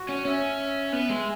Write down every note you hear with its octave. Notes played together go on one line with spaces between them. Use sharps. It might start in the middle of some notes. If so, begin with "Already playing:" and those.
Already playing: F#4
C#4
C#4 E5
B3
G#3